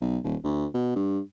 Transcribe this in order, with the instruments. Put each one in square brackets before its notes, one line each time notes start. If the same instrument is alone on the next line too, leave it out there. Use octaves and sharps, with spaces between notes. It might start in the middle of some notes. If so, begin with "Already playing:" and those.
[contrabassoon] B1
D#1
D2
B2
G2